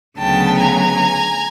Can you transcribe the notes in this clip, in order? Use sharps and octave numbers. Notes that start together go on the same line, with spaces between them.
D2 C#3 F#3 B3 G5 A5
G#5 A#5